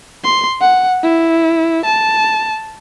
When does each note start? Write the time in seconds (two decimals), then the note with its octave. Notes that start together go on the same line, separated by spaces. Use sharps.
0.24 C6
0.61 F#5
1.03 E4
1.85 A5